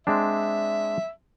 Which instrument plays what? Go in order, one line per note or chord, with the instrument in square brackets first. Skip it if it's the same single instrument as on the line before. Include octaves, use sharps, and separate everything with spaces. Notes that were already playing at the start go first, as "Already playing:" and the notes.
[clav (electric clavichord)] G#3 C4 D4 [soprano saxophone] E5